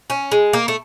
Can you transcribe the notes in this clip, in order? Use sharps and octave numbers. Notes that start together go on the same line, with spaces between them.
C#4
G#3
A#3
A3